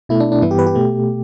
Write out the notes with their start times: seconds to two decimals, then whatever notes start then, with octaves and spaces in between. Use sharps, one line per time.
0.09 B2 A3 E4
0.20 D4
0.32 D4
0.42 G2 E3 B3 E4
0.51 G4
0.59 B4
0.66 G4
0.75 B2 A3